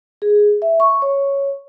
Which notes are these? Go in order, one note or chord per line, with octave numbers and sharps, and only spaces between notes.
G#4
E5
C#6
C#5